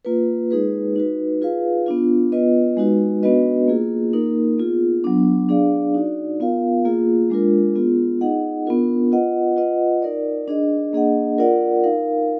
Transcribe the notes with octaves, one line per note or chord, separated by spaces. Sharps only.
A#3 F4 B4
G#3 D#4 G#4 B4
D#4 F#4 B4
F4 G#4 B4 F5
B3 D4 F4
B3 F4 B4 D#5
G#3 D#4 F#4 B4
B3 D4 F#4 B4 D#5
A#3 F4 G#4
A#3 D#4 A#4
B3 F4 G#4
F#3 B3 D4
D4 G#4 D5 F5
D#4 F#4 D5
B3 F4 A#4 F5
A#3 F4 G#4
G#3 D4 F4 A#4
B3 F4 G#4
D#4 G#4 D#5 F#5
B3 D4 F4 A#4
F4 B4 D#5 F#5
F4 B4 D#5 F#5
D#4 A#4 D5
D4 G#4 D#5
A#3 D4 G#4 D#5 F#5
F4 A#4 D5 F#5
D#4 A#4 F5